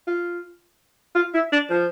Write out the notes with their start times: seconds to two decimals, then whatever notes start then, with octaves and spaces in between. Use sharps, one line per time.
0.07 F4
1.15 F4
1.34 E4
1.52 D4
1.70 F3